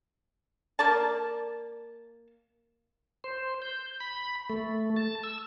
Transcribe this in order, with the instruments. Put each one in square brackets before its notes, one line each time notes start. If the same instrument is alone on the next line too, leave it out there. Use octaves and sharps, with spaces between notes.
[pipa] A#3 D5 A5
[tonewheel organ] C5
G6
B5
A3
A5
E6